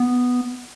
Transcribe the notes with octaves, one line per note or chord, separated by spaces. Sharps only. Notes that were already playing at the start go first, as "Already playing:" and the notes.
Already playing: B3